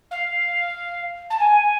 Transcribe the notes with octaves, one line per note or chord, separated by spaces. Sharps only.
F5
A5
G#5